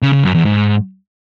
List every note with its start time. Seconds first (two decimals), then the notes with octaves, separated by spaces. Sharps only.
0.02 C#3
0.13 C#3
0.24 F#2
0.34 E2
0.45 G#2